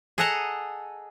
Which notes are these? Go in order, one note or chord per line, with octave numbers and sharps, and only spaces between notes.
G#4 A4 D#5 F#5 A5 A#5